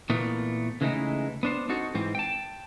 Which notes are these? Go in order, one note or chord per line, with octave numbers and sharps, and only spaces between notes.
A#2 E3 A3 B3 A#4
C#3 E3 G#3 A3 D#4 E4
B3 D4 C5
C4 D#4 F#4 A4
G#2 E3 C4
G5 A5